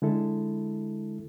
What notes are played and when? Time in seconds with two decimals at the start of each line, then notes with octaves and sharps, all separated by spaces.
0.02 D3 G#3 E4 A4